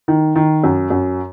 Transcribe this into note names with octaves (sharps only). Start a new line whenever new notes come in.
D#3
D#3
F#2
F#2